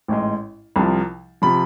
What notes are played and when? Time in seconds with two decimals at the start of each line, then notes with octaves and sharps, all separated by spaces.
0.08 A1 G#2 G#3
0.76 C2 C3 F3
1.42 C3 F3 B5